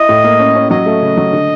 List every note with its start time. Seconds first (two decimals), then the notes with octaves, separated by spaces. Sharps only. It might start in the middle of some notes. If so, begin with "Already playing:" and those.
Already playing: E4 D#5
0.09 A2
0.24 A#3
0.39 C#4
0.55 C#4
0.71 F#3 D#5
0.86 A3
1.02 C#3
1.17 F#3
1.33 D3